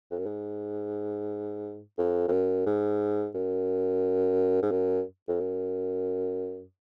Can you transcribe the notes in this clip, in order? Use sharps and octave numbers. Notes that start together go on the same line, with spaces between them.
F2
F#2
G#2
F2
F2
F#2
G#2
F#2
G#2
F#2
F2
F#2